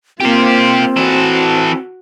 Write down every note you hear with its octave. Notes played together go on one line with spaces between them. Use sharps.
A#3 C4 F4 G4 C5
E3 F#4 A4